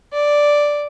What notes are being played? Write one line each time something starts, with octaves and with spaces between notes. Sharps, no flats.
D5